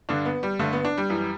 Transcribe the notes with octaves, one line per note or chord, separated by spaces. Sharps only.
G2 D3 D4
B3
G3
G2 D3 A3
B3
D4
G3
F#2 E3